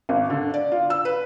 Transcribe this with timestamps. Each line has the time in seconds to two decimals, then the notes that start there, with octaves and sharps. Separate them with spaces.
0.09 G#1
0.30 D3
0.54 D5
0.72 F4
0.90 E6
1.05 B4